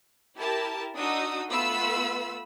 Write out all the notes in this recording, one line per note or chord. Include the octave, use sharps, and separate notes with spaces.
E4 G4 A#4 A5
D4 D#4 F#4 D#6 E6
A3 B3 F4 B4 B5 E6